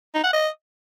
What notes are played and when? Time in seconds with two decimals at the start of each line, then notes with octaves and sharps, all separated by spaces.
0.14 D#4
0.24 F#5
0.33 D#5